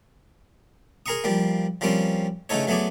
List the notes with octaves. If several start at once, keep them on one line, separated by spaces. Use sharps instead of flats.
G#4 A#4 A#5 C6 C#6 D#6
F3 G3 A#3
F3 G3 A#3 C4 C#4
C#3 E3 A3 D#4 A4 C#5
F#3 A3 B3 G#4 D5